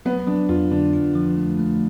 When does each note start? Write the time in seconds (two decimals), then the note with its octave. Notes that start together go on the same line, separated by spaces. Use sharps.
0.05 F#3 B3
0.27 F#3 D4
0.49 F2 F4
0.71 D3 D4
0.93 F4
1.15 F3
1.37 A3
1.59 A3